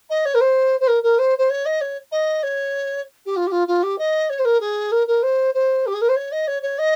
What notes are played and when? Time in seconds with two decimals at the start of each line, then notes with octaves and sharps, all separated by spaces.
0.09 D#5
0.25 C#5
0.34 A#4
0.40 C5
0.80 C5
0.87 A#4
1.03 A#4
1.18 C5
1.38 C5
1.50 C#5
1.65 D#5
1.81 C#5
2.11 D#5
2.43 C#5
3.25 G4
3.36 F4
3.47 G4
3.51 F4
3.67 F4
3.83 G4
3.98 D#5
4.29 C#5
4.39 C5
4.45 A#4
4.60 G#4
4.91 A#4
5.07 A#4
5.22 C5
5.54 C5
5.86 G4
5.93 G#4
6.01 A#4
6.08 C5
6.16 C#5
6.31 D#5
6.47 C#5
6.62 C#5
6.78 D#5